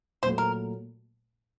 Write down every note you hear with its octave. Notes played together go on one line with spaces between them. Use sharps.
A#2 F#3 A3 C5
A#4